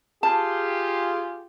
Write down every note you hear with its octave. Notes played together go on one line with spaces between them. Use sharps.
F4 G4 G#4 A5